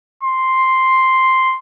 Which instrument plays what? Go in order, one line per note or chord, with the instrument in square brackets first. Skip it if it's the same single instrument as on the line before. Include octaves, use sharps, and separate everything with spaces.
[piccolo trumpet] C6